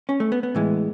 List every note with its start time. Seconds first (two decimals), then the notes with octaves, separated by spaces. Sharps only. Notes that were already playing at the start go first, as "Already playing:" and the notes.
0.09 C#4
0.20 A3
0.32 B3
0.43 B3
0.55 A2 E3 G#3